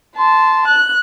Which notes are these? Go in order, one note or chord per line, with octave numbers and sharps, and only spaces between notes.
A5 C6
F#6